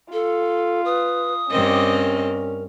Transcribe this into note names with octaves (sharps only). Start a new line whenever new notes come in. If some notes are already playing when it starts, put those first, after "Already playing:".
F4 A4
B4 D#6
G2 C4 C#4 A#4 D#5